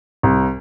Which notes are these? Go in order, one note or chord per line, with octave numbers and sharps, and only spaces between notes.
C2